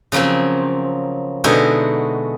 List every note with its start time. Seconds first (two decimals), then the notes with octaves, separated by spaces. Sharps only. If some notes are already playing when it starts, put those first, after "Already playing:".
0.12 C#3 F3 F#3 A#3 C4
1.44 B2 D3 G#3 D#4 E4 F#4